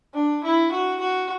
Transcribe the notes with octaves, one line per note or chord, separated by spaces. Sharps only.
D4
E4
F#4
F#4